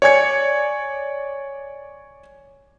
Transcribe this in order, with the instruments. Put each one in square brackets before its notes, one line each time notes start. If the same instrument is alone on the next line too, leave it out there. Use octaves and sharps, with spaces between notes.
[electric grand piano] C#5 D5 G#5 G#6 C#7